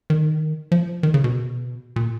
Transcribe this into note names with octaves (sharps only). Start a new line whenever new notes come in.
D#3
F3
D#3
C#3
B2
A#2